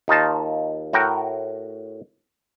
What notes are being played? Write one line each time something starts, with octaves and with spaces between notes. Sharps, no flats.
D#2 D#4 F4 A5
A2 F#4 A#4 G5 A#5